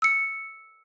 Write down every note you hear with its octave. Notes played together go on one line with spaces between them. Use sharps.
E6 C#7